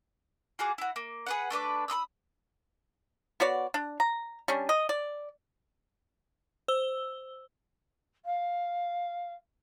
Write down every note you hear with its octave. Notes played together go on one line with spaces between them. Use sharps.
F4 F#4 G#4 D6
E4 F#4
A#3
G#4 B4 F#5
A3 D4 B4 D6
B5 C6 D#6 E6
B3 F#4 C#5 D5
D4
A#5
G3 C#4 D4
D#5
D5
C5 E6 G7
F5